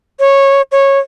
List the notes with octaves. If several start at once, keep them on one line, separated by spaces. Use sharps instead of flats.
C#5
C#5